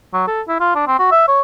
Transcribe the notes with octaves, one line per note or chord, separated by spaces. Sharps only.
F#3
A4
E4
F4
D4
C4
F#4
E5
C#5